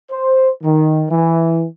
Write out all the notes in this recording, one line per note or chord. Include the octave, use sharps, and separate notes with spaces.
C5
D#3
E3